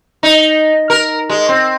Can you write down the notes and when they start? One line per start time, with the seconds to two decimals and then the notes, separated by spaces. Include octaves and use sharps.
0.23 D#4
0.90 A#4
1.30 G#3
1.49 C4